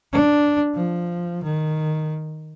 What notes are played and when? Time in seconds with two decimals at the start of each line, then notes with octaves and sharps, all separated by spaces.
0.12 D4
0.74 F3
1.43 D#3